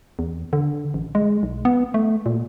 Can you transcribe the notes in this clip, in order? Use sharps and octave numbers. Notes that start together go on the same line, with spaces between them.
E2
D3
A1
G#3
B1
B3
A3
A#2